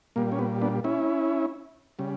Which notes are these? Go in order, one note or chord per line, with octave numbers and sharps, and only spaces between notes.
A#2 G3 A#3
C#4
B3
B3 D4
C#4 E4
C#3 G3